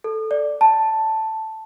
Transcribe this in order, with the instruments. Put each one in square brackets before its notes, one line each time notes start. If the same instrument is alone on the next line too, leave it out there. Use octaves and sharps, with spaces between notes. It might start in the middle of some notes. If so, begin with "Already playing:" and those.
[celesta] A4
D5
A5